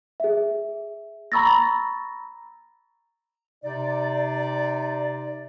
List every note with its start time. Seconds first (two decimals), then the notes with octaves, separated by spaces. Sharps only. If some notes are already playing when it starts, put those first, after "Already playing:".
0.20 G#4 E5
1.32 A#5 B5 C#6 E6 A6 A#6
3.64 C3 D#4 D5